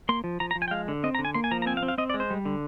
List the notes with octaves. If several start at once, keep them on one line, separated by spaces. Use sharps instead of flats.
A#3 C6
F3
F3 A#5
A#5
F3
G#5
G5
G#3 F5
D3
C4 D#5
A#5
D3
G#5
A#3 C6
G#5
F3 A#5
A#5
C4 G#5
F5
C4
F5
C4 D#5
D5
G#3
C5
G3
D3